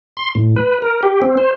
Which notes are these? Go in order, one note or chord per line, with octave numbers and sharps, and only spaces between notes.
C6
A2
B4
A#4
G4
C4
C5